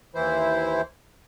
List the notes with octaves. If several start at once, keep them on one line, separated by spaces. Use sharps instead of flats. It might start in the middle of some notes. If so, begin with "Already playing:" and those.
D#2 E3 E4 C5